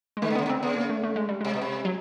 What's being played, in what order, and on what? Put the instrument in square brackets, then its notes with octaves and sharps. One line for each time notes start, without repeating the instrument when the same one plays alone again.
[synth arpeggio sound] G#3
[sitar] D#3 [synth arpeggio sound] A3
[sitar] D3
[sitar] C#3 [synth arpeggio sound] B3
[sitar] D3
[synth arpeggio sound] C4
[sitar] C#3 [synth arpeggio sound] B3
[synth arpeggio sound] A#3
A3
A3
G#3
G3
[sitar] C3 [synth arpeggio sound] G#3
[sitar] B2
C3
[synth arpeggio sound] F#3